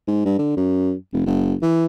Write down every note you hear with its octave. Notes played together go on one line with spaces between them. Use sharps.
G#2
G2
D3
F#2
F1
F#1
E3